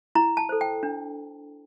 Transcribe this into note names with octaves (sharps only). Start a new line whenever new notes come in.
E4 A#5
A5
A4 C5
G5
D4